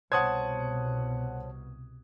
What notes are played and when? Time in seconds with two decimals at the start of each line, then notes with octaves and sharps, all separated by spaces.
0.12 C2 B2 C5 C#5 F#5 A5 D#6 G#6